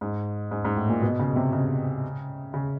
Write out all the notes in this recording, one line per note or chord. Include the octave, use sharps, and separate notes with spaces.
G#2
G#2
G#2
A2
A#2
B2
C#3
C3
C#3
C#3